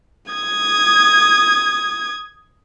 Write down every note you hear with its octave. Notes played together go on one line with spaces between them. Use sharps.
D#6 G#6